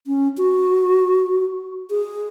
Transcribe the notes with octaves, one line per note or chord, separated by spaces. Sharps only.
C#4
F#4
G#4